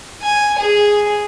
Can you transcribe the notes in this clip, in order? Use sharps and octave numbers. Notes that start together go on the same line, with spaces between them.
G#5
G#4